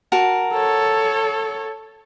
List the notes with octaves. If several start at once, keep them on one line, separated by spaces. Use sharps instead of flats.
F#4 A#4 A5
A4 C#5